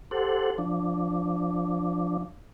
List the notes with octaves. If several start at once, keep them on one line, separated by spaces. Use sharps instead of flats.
G4 A4 C5 F#5
F3 D4